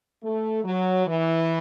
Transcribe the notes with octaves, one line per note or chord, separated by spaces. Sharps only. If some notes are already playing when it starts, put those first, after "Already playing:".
A3
F#3
E3